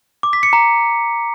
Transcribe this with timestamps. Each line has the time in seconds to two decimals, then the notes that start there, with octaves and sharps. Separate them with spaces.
0.23 D6
0.33 B6
0.43 C#7
0.53 A#5